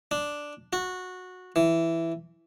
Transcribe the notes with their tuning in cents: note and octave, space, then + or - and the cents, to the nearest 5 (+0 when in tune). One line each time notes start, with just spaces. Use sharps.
D4 +0
F#4 -15
E3 +5